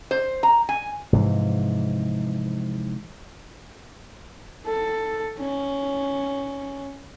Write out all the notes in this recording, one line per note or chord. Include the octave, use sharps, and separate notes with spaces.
C5
A#5
G#5
G#2 C3 E3 F3
A4
C#4